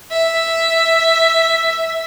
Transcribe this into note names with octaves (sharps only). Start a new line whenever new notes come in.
E5